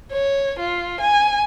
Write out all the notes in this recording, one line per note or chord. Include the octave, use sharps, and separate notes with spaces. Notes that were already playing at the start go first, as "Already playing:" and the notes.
C#5
F4
G#5